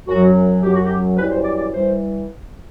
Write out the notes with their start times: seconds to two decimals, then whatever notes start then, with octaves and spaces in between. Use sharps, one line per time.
0.07 F#2 F#3 F#4
0.62 F#2 F#3 G4
0.73 F#4
0.84 G4
1.16 F#2 E3 G3 B4
1.31 C5
1.44 D5
1.58 D5
1.71 E3 G3 C5